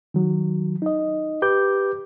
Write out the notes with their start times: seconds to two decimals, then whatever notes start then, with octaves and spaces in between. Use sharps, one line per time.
0.14 D#3 F#3
0.82 D#4 D#5
1.42 G4 B4 D6 G6